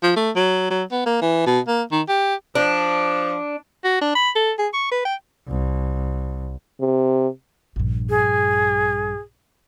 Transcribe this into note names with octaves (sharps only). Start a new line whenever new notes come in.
F3
A3
F#3
F#3
B3
A#3
E3
B2
A#3
D#3
G4
F3 D4
F#4
D4
B5
A4
G#4
C#6
B4
G5
C2
C3
A#1 G2
G#4